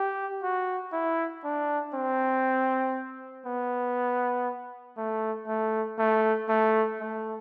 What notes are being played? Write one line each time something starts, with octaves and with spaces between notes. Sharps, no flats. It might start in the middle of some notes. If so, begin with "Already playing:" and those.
Already playing: G4
F#4
E4
D4
C4
B3
A3
A3
A3
A3
A3